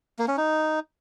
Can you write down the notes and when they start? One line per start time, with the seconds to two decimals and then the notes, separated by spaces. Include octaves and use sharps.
0.19 A#3
0.28 C#4
0.37 D#4